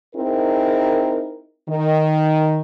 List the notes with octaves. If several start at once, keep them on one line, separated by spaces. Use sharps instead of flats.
C4 D#4 E4 G#4 A#4
D#3